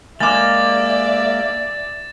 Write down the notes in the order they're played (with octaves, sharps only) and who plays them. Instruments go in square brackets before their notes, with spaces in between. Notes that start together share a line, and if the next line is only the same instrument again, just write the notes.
[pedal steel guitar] G#3 A#3 [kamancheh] D5 E5 [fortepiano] G#5 D6 [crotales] A6 E7